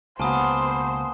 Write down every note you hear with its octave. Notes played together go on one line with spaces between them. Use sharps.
C#2 B2 A#3 B3 C5 G#5 A5 D#6